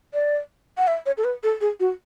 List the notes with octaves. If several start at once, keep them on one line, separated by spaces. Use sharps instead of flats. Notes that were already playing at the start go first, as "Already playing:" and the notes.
D5
F#5
E5
C#5
A4
B4
A4
G#4
F#4